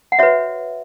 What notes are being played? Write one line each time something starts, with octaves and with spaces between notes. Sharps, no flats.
F#5
F#4 B4 C#5 E5